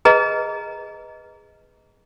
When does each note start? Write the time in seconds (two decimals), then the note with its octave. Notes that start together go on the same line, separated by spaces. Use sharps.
0.05 G#4 B4 D#5 A#5